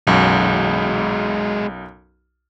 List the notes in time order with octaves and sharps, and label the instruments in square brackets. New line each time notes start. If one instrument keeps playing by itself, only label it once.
[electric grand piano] B1 F#2 [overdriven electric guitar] G#3 F#4